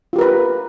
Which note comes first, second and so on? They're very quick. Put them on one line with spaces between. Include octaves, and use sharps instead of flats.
F4 G4 A#4 B4